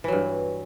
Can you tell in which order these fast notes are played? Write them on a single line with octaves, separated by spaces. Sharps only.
E3 F#3 G2